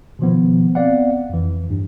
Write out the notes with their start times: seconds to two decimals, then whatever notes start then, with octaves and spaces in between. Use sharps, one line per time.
0.19 B2 D#3 F3 B3
0.75 B3 C4 D5 F5 F#5
1.30 F2 E3
1.70 G2